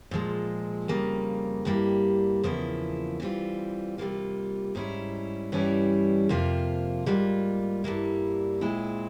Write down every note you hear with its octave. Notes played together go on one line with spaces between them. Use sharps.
A#2 F3 G#3
F2 C#3 G3 A#3
G2 G3 A#3 E4
E2 C#3 F3 A#3 E4
E3 G3 C4 F4
C3 G3 A#3 F4
G#2 G3 C#4 E4
G2 E3 G3 C#4 E4
F2 C3 F3 A#3 F4
G#2 G3 A#3 F4
G2 G3 A#3 E4
A#2 G#3 C4 E4